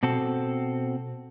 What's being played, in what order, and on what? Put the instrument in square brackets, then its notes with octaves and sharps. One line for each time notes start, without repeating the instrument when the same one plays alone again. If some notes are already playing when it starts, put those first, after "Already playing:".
[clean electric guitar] B2 C4 F#4 A4